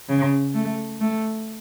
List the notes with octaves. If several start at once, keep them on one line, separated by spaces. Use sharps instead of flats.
C#3
A3
A3